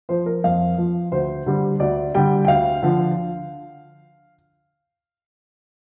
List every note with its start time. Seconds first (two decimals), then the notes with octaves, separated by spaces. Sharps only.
0.09 F3 C5
0.26 A#4
0.44 F2 F5
0.78 F3
1.12 D2 C5
1.46 D3 G3
1.80 D2 D5
2.15 D3 G3 G5
2.45 G5
2.48 D2 F5
2.82 D3 F3